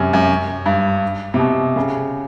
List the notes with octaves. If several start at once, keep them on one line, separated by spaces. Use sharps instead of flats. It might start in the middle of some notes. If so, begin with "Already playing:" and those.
Already playing: F#2 C3
F#2
G2
C3
B2
C#3